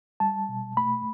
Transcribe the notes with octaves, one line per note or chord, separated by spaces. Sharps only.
G3 A5
B2
A3 B5